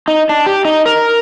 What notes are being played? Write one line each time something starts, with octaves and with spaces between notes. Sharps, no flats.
D#4
D4
G4
D#4
A#4